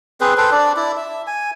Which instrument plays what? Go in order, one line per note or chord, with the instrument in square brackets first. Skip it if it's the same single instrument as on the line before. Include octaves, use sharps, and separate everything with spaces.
[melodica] C4 G#4 B4 C5
A4 B4 C5 G5
D4 D5
E4 D5
E5
G#5